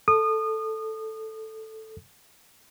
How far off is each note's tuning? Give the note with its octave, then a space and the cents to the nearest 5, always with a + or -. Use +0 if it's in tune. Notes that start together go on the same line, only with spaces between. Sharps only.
A4 +0 D#6 -30